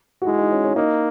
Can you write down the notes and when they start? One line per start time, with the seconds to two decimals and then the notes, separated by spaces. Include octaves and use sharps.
0.22 F#4
0.26 G#3 E4
0.39 D#4
0.52 C#4
0.64 C#4
0.76 A#3 D#4